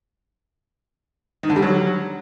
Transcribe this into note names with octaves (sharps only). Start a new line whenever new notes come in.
D#3
D3
G3
F#3